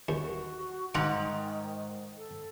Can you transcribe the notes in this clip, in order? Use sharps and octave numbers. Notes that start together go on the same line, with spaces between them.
D#2 F#4
G#2 D#3 F#5 A#5
A4